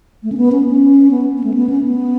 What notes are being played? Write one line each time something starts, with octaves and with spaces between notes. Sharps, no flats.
A3
C#4
B3
C#4
C#4
B3
B3
A3
B3
C#4
B3